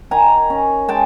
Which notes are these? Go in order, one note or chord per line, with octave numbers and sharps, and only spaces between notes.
D#3 G#5 A#5
C#4
G#3 G5 A5